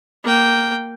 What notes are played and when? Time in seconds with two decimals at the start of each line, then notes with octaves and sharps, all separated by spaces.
0.24 A#3 G5